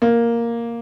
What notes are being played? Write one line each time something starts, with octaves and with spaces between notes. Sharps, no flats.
A#3